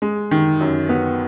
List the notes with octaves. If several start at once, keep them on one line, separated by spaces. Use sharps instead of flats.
G#3
D#3
F#2
B3